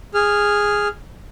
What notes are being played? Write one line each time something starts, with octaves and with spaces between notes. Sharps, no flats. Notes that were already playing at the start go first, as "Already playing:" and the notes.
G#4 F6